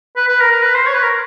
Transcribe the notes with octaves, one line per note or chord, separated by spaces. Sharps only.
B4
B4
A#4
A#4
B4
C5
C#5
B4
A#4